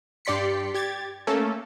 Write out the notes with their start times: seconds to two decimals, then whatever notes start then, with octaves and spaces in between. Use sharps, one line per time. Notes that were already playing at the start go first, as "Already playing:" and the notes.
0.25 G2 G4 D5 C6 B6 C#7
0.74 G4 G#6 A6
1.27 A3 A#3 C#4 A4